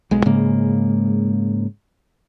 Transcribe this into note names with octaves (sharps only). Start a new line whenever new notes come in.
B1 G#3
G#2 C#3 G#3 A#3